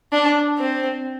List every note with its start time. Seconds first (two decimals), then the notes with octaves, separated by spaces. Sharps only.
0.12 D4
0.58 C4